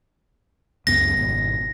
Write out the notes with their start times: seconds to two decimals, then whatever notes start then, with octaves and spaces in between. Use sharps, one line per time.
0.87 C#2 F#2 B3 A#6
1.18 G#1 B2